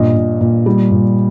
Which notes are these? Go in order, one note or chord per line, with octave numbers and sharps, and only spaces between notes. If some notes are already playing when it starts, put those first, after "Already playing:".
Already playing: G2 A#2 D#5
A#2
A#2
G3
A#2